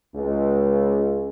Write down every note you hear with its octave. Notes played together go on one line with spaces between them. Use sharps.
C#2